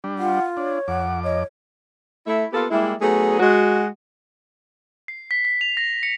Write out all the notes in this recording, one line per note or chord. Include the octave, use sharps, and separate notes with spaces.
G3 D4
F4 F#5
D4 C#5
F2 F#5 D6
C#5 D#5
A3 E4 E5
A#3 B3 F4 G4 A4 B4
G3 G#3 A#3 E4
F#3 A3 B3 D#4 G#4
G#3 F#4
C7
B6
B6
F7
A#6
C#7